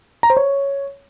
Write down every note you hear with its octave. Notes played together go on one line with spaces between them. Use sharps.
A#5
C5
C#5